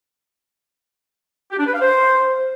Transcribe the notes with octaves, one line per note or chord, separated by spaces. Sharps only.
G4
D4
B4
F5
C5